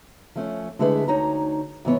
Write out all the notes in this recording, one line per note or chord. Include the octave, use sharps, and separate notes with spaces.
F3 A3 C#4
D3 G#3 A3 E4 G#4 B4
D2 D#4 C#5 A#5
G#2 E3 B3 C#5